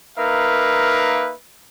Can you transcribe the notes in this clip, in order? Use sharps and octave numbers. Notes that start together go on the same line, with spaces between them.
A#3 D#4 A#4 B4 E5 F5